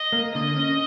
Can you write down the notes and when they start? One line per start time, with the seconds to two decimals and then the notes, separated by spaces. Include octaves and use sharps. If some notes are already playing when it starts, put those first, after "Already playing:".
Already playing: D#5
0.12 A#3
0.34 D3 D#5
0.56 C#4